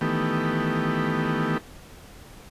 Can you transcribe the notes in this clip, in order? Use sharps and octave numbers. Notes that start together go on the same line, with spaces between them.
D#3 E3 A3 B3 G4